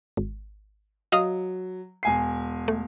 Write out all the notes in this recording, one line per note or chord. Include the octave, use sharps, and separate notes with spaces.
G#1
F#3 D#5 F5 D#6
E1 G#5 C7
A3